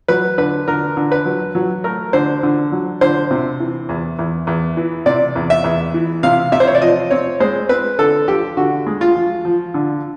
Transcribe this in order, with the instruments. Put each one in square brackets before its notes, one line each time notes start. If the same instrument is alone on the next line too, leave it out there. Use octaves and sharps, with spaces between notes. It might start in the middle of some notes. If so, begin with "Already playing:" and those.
[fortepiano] F#3 B4
D3 B4
D3 A#4
D3
B4
F#3
F#3
A3 A#4
D3 C5
D3
F#3
D3 C5
C3
E3
E2
E2
E2
E3
C3 D5
E2
E5
E2
E3
C3 F5
C3 E5
C5
C#5
D5
F3 D#5
C4 C#5
G#3 C5
C4 B4
D3 A4
F3 G4
D3 F#4
G#3
F4
F3
F3
D3